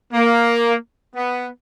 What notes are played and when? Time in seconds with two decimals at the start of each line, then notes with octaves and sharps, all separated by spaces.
0.13 A#3
1.16 B3